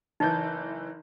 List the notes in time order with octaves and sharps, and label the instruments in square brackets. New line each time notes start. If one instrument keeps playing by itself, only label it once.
[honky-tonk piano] F#1 E3 G6 [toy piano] D#4